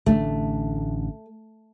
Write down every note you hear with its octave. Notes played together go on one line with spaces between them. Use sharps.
A1 D3 A3 D4